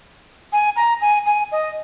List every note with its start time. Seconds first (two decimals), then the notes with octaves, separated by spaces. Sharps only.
0.53 G#5
0.76 A#5
1.01 G#5
1.26 G#5
1.52 D#5